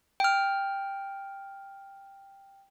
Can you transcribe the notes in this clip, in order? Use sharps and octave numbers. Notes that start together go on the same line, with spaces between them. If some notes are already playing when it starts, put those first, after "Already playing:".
G5 F6